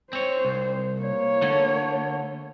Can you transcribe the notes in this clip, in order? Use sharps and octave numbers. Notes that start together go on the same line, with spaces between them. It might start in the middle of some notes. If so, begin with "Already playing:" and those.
C4 C5 C#5
C2
A#3 C#5
D3 A3